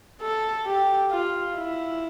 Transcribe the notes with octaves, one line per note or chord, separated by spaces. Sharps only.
A4
G4
F4
E4